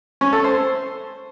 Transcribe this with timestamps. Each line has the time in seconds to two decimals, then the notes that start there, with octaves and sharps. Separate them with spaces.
0.21 C#4
0.33 A4
0.44 C5